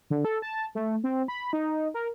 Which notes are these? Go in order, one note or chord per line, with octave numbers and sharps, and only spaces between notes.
D3
A4
A5
A3
C4
B5
D#4
A#4